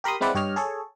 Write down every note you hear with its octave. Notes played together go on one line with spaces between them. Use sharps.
G4 A#4 B5 C6 D#6
G#3 C4 E4 B4 D5 F#5
G2 G4 C#5 D#5 F6
G#4 A4 C#5